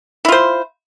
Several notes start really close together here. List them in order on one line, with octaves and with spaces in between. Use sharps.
E4 F4 C5